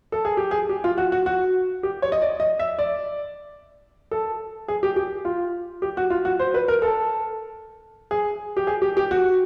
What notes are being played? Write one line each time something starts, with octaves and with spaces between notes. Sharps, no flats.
A4
G#4
G4
G#4
G4
F4
F#4
F#4
F#4
G4
C#5
D#5
D5
D#5
E5
D5
A4
G#4
G4
G4
F4
G4
F#4
F4
F#4
C5
B4
A#4
A4
G#4
G4
G#4
G4
G4
F#4